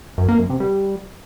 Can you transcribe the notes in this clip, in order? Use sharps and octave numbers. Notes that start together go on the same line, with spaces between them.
F#2
A#3
F#2
C3
G3